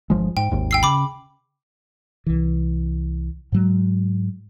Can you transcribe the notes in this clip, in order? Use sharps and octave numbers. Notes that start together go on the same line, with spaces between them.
G1 F3 G#3
G#2 G5
G#1 D#2 G#2
G5 E6 C7
C#3 B5 D6
C2 E3
G#2 F#3 G#3